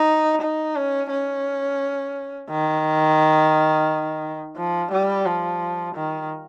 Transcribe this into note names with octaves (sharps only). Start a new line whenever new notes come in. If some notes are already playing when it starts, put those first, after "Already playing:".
Already playing: D#4
D#4
C#4
C#4
D#3
F3
G3
F3
D#3